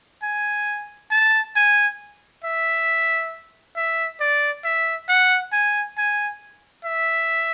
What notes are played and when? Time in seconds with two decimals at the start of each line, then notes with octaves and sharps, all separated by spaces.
0.23 G#5
1.11 A5
1.56 G#5
2.44 E5
3.76 E5
4.20 D5
4.64 E5
5.09 F#5
5.52 G#5
5.98 G#5
6.85 E5